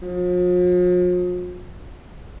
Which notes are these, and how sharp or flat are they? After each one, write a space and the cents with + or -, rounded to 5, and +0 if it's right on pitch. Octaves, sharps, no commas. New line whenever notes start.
F3 +45